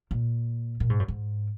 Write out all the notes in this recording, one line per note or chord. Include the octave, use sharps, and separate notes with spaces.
A#2
A#2
G#2
F#2
G#2